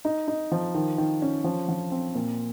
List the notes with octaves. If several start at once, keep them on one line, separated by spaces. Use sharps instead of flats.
D#4
D#4
F3
D#3
D#3
C#4
F3
F3
C4
A#2